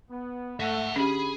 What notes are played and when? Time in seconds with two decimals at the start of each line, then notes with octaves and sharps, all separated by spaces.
0.11 B3
0.60 A3 C#5 E5 F#5
0.96 D3 C#4 G4 G#4 B5